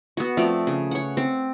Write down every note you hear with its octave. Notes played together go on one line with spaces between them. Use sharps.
B3 F#4
F3 A3 C4 D5
C#3
C#5 F#5
C4